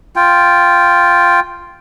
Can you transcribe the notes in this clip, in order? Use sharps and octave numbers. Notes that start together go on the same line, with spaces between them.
F4 G5